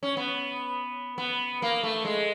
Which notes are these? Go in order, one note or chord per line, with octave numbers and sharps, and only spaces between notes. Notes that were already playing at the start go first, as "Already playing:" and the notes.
C#4
B3
B3
A#3
A3
G#3